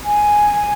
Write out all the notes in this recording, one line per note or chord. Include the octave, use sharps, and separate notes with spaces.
G#5